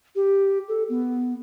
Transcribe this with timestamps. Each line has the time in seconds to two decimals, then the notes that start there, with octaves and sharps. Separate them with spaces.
0.15 G4
0.68 A4
0.89 B3